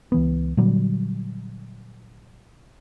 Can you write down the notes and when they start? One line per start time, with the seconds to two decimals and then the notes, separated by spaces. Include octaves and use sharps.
0.12 C#2 E3 B3
0.57 A#2 D3 F#3 G3